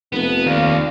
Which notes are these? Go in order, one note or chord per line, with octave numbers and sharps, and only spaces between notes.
F1 C3 F3 B3
D#2 D5 F5